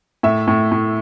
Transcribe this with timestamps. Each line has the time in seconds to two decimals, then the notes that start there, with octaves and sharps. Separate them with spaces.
0.23 A2 E5
0.48 A2
0.72 A2